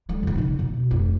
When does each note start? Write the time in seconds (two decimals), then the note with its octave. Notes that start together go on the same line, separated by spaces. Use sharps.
0.09 D3 G#3
0.23 A#2 C#3
0.35 C#3 D#4
0.59 B2
0.91 F1 D2